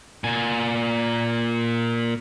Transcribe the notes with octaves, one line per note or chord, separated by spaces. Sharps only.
A#2 G#5